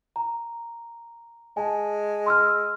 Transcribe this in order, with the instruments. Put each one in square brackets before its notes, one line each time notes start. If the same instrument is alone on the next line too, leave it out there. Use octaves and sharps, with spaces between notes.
[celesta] A#5
[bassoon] G#3 [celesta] G#5 A5
[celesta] C6 E6 F6